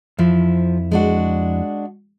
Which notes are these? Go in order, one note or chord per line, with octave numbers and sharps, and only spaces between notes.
F2 F3 E4
G#3 D4 F#4